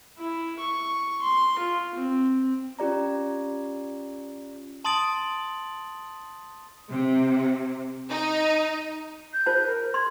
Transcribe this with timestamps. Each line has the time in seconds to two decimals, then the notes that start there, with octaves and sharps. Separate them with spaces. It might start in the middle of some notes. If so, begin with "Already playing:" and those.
0.19 E4
0.60 C#6
1.22 C6
1.59 F4
1.95 C4
2.79 C#4 F4 G4 D5 A#5
4.85 A5 C6 D#6 A6 D7 F#7
6.90 C3
8.09 D#4
9.33 G6
9.46 F4 C5 A5
9.66 A#4
9.94 C6 G#6